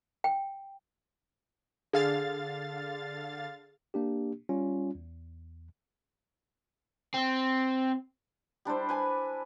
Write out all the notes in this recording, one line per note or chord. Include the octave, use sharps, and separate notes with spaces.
G5
D3 G#4 F5 A6
A#3 D4 G4
G3 C#4 F4
E2
C4
G3 D4 E4 C5
B4 G#5 B5